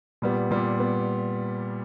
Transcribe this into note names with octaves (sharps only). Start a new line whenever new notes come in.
A#2 G3 B3
A#2 G3 B3
B3